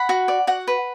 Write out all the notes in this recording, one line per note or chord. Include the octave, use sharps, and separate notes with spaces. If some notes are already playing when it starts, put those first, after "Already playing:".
Already playing: F#5 B5
F#4
D5
F#4 F#5
B4